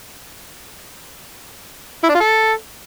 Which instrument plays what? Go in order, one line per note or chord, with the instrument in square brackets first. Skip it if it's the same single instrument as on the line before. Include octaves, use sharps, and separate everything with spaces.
[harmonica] E4
D4
F4
A4